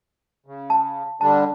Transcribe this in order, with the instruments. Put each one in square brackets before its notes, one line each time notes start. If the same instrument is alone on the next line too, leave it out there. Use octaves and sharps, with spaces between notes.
[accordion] C#3
[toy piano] A5
[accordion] D3 G3 D4 [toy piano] A5